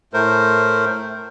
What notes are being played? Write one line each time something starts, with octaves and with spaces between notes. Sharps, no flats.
A2 A3 A#4 C5